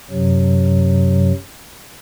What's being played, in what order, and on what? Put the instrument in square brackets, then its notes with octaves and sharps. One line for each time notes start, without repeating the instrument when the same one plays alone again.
[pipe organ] F#2 C3 F#3